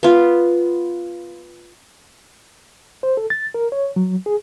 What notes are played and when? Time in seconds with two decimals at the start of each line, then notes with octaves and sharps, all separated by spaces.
0.03 B3 F4
3.03 C5
3.17 A4
3.30 A6
3.54 A#4
3.72 C#5
3.96 F#3
4.26 G#4